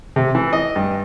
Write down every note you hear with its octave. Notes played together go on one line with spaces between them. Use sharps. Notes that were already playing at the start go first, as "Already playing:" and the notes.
C3
E3
D#5
G2